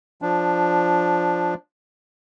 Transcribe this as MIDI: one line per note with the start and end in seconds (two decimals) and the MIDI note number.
0.22 1.54 53
0.22 1.54 62